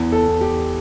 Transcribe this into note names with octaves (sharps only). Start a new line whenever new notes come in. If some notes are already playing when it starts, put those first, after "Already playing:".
Already playing: E2
A4
E2
G4